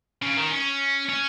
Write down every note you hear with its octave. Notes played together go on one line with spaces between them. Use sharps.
C#3
D#3
C#4
C#4